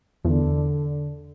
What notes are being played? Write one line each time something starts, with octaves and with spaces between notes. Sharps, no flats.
E2 D3